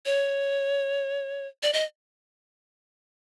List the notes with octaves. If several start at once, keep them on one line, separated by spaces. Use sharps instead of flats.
C#5
D5
D#5